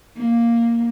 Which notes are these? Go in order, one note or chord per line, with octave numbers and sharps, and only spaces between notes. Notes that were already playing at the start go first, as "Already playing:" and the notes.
A#3